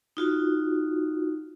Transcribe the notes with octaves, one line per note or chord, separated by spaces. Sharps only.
D#4 F4 F#4